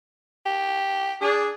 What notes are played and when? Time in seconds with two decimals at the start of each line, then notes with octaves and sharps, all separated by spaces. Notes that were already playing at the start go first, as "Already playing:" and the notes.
0.46 G4
1.22 D4 G#4